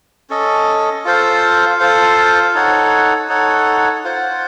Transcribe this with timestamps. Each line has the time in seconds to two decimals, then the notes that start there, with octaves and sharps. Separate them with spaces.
0.30 C#4 A4 D#5
1.05 F4 A4 C5 F5
1.80 F4 A4 C5 F5
2.54 D#4 A4 C#5 F#5
3.29 D#4 A4 C#5 F#5
4.04 F4 C5 F#5